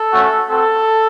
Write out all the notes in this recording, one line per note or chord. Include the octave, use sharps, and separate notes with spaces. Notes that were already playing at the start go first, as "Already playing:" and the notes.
Already playing: A4
A3 C#4 F#4
C4 F#4 A4